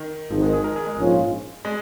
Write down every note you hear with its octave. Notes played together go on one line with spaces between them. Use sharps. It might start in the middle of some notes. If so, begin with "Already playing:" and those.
Already playing: D#3
G#1 G#2 D#3 F3
G#3
G#4
A#4
G#4
G#3
A#1 G#2 F3 C#4 F4
G#3